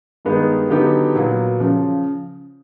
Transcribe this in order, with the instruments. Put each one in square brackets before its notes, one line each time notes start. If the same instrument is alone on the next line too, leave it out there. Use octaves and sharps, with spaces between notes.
[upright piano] G2 D#3 G#3 B3 D#4
D3 F#3 B3 D#4 G4
A#2 F#3 B3
C#3 F3